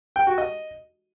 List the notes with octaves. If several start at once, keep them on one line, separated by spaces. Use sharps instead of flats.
G5
F#4
D#5